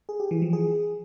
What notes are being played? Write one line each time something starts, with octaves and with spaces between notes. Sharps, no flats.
G#4
G4
E3
F3
G#4